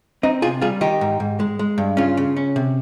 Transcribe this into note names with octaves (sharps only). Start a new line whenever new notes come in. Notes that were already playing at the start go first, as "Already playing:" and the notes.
C4 D#4
C3 F4 G#4
G3 F4 G#4
D#3 D#4 G4
G#2
G#2
G#3
G#3
G2
C#3 C#4 F4
C#3
C#4
C3